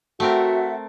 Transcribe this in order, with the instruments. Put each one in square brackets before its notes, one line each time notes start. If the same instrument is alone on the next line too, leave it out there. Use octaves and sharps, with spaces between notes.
[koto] A3 C4 A#4 [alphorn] F#4 [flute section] E5 F#5